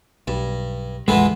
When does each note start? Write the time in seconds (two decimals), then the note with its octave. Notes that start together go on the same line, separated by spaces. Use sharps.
0.28 B1 G2
1.08 A#1 F2 D3 E3 G#3 B3